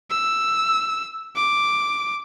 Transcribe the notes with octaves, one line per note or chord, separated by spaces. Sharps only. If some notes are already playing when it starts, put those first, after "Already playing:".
E6
D6